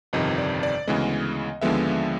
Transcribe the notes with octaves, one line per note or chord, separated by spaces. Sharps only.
G1 F2 C3 D#3 D#5
D5
D5
D2 C#3 E3 G#3 B3 D#5
D#2 D3 F3 G#3 B3 E5